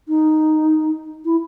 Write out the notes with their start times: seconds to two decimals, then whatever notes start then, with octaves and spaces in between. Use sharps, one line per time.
0.08 D#4
1.25 E4